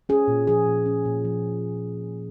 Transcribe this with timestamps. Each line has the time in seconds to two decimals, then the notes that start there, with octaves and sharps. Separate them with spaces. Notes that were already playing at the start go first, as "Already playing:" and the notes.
0.09 C#4 G#4
0.28 A#2
0.47 F3 G#4
0.67 A#2
0.86 C#4
1.05 A#2
1.25 F3